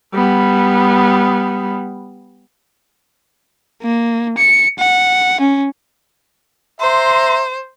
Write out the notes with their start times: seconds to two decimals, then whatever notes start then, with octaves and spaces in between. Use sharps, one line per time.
0.15 G3 B3
3.82 A#3
4.38 C#7
4.78 F#5
5.40 C#4
6.81 C5 E5 A#5 C6